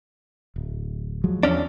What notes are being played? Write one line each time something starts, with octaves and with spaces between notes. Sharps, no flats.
D1
F3 F#3 G#3
E2 F3 C#4 D4